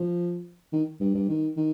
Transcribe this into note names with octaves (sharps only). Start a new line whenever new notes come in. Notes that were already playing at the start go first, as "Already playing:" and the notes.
Already playing: F3
D#3
G2
G2
D#3
D#3